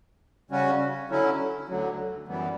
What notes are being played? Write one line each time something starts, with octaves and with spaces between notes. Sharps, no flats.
C#3 G3 C#4 F#4
D3 F#3 C#4 E4
D2 D3 F#3
F#2 E3 G3 B3